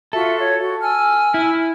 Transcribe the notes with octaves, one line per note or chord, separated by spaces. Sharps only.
F4 F#4 A4 E5
C#5
F#4
G#5 E6 F6
E4